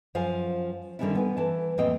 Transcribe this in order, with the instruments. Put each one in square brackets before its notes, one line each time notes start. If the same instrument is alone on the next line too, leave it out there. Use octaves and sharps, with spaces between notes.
[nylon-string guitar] F#2 F3 C5 F5 G#5
D3 D#3 G3 C#4 D4 E4
B3 G#5
E3 A5
F2 A2 A#3 C4 D#5 G5